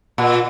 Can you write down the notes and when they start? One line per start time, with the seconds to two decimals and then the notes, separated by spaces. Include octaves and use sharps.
0.18 A#2